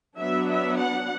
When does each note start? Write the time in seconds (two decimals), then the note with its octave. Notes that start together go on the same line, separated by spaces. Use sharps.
0.18 F#3 B3 D4 E5
0.48 E5
0.78 F#5